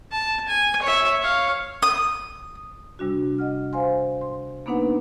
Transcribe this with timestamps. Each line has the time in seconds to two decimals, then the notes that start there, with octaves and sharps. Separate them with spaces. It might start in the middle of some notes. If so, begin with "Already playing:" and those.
0.11 A5
0.48 G#5
0.82 C#5 E5
1.21 C#5 F5
1.83 D#6
2.99 C3 G3 D4 F#4
3.38 D#5 F#5 F6
3.73 C5 F5 G#5 C6
4.21 C6
4.66 A#3 B3 D4 D#4 B4 F#5